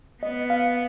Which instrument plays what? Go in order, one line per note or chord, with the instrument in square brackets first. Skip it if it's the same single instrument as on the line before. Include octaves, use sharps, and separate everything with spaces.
[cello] B3 [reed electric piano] D#5
[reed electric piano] F5